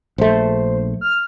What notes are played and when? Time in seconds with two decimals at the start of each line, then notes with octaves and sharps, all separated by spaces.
0.18 A#1 A3 C5
1.01 F6